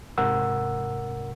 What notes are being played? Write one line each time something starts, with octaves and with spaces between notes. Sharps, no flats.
G#2 C3 A#4 F#5 E6